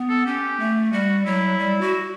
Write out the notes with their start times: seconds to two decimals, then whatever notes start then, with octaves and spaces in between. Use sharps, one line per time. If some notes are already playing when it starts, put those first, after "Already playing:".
Already playing: B3
0.09 A4
0.26 C#4 G4
0.60 A3
0.92 G3 F#4
1.26 F#3 E4
1.59 G3
1.81 F#4